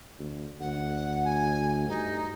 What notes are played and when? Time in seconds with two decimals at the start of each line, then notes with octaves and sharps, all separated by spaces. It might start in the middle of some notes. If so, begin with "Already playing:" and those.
0.19 D2
0.60 D2 F#5
1.24 G#5
1.88 G2 D#4